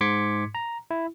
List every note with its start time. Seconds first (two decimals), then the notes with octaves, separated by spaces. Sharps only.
0.01 G#2 C6 D6 G#6 B6 C#7
0.55 A#5
0.91 E4